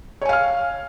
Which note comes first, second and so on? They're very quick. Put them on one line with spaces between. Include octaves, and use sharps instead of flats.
C#5 G#5 F5 F6